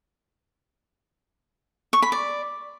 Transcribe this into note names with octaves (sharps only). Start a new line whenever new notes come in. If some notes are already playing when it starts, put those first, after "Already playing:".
C#6
B5
D5